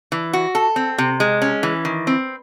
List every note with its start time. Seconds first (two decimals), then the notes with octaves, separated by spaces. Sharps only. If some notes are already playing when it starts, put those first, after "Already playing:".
0.12 E3
0.33 F#4
0.55 A4
0.76 C4
0.98 C3
1.20 G#3
1.42 C#4
1.63 E3
1.85 D#3
2.07 C4